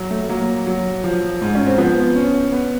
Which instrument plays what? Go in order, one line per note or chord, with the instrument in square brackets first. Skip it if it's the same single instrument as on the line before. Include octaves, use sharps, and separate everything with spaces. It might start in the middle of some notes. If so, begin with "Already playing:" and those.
Already playing: [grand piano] F#3
[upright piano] A3
[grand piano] F#3 [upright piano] A#3
[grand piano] F#3
F3
G#2
[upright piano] C#4
C4
[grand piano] F3 [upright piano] B3
[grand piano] C#4
B3